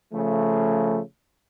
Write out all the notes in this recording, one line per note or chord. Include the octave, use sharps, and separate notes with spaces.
C#3 F3 A3